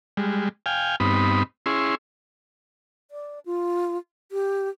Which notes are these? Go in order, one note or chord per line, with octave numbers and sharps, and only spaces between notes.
G3 G#3
F5 G5 G#5
G2 B3 C4 D#4 B5
C#4 E4 G#4 C6
D5
F4
G4